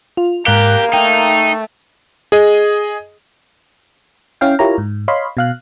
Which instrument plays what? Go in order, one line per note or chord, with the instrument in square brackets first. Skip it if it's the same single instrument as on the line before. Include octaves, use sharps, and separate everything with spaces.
[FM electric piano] F4
[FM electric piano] G#2 F#6 [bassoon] A#3 [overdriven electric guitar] G4 [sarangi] A#4
[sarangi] A3 [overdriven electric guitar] D#4 [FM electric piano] G5
[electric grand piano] G#4 D#5
[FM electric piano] C#4 E4 F5 G5
E4 F4 G4 A#4 C#5 A#5
G#2
C#5 D#5 F5 B5 C6
B2 F5 F#6